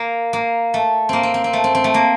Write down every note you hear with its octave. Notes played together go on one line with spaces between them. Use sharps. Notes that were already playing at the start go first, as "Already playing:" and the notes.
Already playing: A#3
A#3
A3
A#3 C4
C4
C4
C4
A3
C4
C4
A3
A#3